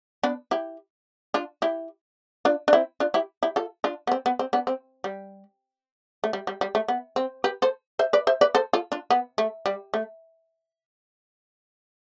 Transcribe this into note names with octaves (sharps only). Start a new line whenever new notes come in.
B3 D4
E4 G4
D4 F4
E4 G4
D4 F4
D4
C4 E4
D4 F4
E4 G4
E4 G4
F4 A4
D4 F4
B3
C4
B3
C4
B3 D4
C4
G3
A3
G3
G3
G3
A3
B3
C4
G4 B4
A4 C5
C5 E5
B4 D5
C5 E5
B4 D5
A4 C5
F4 A4
D4 F4
B3
A3
G3
A3